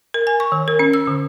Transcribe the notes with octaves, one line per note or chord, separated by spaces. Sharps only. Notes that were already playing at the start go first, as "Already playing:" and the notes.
A#4
G#5
C#6
D#3
A#4
C#4
E6
D3